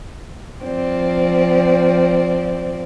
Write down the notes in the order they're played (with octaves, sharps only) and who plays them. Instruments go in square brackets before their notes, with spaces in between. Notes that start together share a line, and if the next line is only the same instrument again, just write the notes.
[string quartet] F3 C4 D5